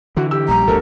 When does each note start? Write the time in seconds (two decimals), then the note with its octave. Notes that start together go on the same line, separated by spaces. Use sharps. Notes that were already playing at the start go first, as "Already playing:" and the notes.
0.17 D3 E3 F#4
0.31 G4 E6
0.48 A#1 G3 A#5
0.68 G1 D2 D3 A4 A#4